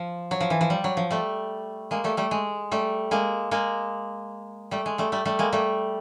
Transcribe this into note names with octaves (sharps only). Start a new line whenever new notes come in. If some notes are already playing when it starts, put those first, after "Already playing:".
Already playing: F3
F#3
F3
E3
F3
G3
F#3
F3
G3 A3
G#3 A#3
G3 A3
G3 A3
G#3
G3 A3
G#3 A#3
G#3 A#3
G3 A3
G#3
G3 A3
G3 A3
G3 A3
G#3 A#3
G3 A3